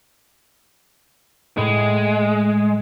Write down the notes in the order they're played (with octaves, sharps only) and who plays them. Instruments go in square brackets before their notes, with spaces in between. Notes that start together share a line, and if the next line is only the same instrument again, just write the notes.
[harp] A2 [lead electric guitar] G#3